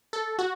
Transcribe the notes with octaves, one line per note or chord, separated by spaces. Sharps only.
A4
F#4